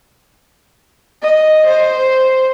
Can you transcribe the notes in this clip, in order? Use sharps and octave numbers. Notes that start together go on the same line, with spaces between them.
D#5
C5